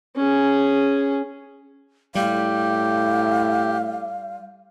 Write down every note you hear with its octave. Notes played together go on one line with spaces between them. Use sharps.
C#4 G#4
A2 G3 G4 F5